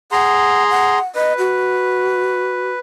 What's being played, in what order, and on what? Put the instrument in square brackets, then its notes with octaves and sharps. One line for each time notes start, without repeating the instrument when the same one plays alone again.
[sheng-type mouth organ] G#4 A#5 C6 [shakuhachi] F#5
[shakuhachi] F#5
[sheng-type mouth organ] B4 [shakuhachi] D#5
[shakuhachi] F#4